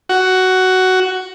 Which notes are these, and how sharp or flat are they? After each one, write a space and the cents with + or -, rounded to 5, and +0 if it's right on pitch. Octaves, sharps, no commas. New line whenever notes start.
F#4 +10